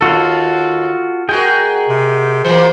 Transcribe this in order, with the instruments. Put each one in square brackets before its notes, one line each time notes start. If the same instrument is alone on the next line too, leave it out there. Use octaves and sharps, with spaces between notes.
[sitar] D#2 [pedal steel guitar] F4 F#4 A4
[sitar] G#3 F#4 A#4 [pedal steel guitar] G#4 G5
[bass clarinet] C3
[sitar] E3 F#3 A#3 [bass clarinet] C5